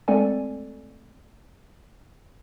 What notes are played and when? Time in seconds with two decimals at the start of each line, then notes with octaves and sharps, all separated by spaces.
0.08 G#3 A3 C4 A4 D5 G#5